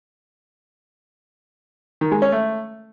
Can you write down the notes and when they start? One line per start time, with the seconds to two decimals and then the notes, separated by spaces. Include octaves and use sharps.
2.01 D#3
2.12 G#3
2.22 C#4
2.32 A3